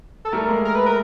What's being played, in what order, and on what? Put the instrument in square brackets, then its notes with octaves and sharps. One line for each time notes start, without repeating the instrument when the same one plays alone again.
[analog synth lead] A4
[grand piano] G3 A3 [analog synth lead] A#4
[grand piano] G#3 A#3
[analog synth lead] A#4
B4
A#4